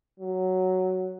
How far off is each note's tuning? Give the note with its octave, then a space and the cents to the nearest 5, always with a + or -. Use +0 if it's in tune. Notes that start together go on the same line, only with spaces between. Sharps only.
F#3 +5